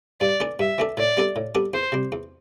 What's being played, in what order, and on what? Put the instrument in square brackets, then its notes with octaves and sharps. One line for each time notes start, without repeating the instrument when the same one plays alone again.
[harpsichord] G2 [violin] D5
[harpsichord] E3 A3 D4 A4
[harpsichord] G2 [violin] E5
[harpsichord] E3 A3 D4 A4
[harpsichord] A2 [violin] D5
[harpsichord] G3 B3 D4 A4
A2
G3 B3 D4 A4
[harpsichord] E2 [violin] C5
[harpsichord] C3 G3
E2